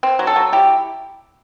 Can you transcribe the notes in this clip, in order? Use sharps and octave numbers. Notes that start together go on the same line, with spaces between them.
C4
F#3
A4
F#3
E4 G4